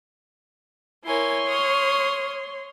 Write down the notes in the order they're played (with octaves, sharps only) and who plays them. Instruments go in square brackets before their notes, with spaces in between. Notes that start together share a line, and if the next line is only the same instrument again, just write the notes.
[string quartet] E4 A#4 G#5 [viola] C#5 C6
[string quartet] C#6 D#6 F6